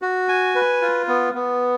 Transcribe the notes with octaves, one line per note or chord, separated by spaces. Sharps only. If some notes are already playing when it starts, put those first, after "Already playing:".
F#4
G#5
B4
F4
B3
B3